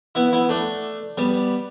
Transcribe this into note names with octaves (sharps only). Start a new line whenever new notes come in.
B3 E4
B3 E4
A3 D4
G3 B3